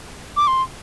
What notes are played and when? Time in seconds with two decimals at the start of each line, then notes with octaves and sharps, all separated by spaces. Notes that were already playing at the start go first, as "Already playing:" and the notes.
0.37 D6
0.47 C6